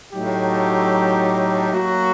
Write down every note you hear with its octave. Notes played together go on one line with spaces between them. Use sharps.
A2 F#3 A3 D#4 G4
F#3 A#3 F#4